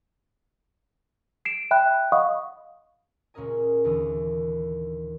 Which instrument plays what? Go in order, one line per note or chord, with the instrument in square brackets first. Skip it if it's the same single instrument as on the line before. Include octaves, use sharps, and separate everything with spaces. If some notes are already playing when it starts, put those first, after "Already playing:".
[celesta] C7 D7 E7
E5 G5 B5 F#6
D#5 F5 F#5 B5 C#6 D#6
[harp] C#2 A#2 C#4 A#4 D#5 G#5
D#2 D3 E3 D#6